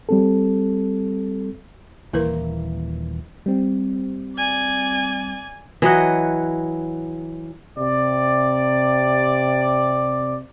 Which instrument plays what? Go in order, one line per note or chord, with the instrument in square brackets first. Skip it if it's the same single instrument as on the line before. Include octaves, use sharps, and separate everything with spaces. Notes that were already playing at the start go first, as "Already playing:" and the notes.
[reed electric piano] G3 C4 A4
[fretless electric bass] D#1 E3 A#3 [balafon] E4 A#4 B4
[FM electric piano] G3 C4
[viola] D5 G#5
[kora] E3 F#3 D#5 F#5
[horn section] C3 D5